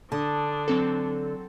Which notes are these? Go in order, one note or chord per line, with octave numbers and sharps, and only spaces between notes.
D3 D4 A5 D#6
F#3 C4 A4